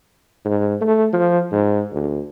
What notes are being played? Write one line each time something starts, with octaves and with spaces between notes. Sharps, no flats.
G#2
A3
F3
G#2
D2